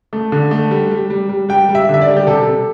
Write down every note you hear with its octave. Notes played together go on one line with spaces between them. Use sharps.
A3
D3
A3
G3
G3
G3
G3
G3 G5
G3
E5
D3
E5
D5
G3
G4
C3 A4
C3